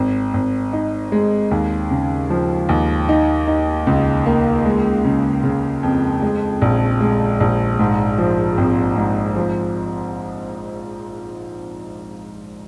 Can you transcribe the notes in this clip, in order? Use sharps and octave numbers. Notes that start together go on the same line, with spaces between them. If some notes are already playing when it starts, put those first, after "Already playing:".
Already playing: G#1
G#1
D#4
G#3
D#2
C#3
F3
D#2
D#4
D#4
C#2
A#3
G#3
C#3
C#3
F2
G#3
A#1
G#3
A#1
G#2
F3
G#1
G#2
F3